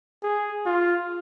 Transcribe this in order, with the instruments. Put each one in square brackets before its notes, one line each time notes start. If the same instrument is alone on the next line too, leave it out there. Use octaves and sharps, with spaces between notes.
[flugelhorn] G#4
F4